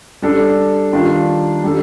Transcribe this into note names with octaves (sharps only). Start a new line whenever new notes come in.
G3 D4 A4
D#3 G3 D4 F4
G3 D4 A4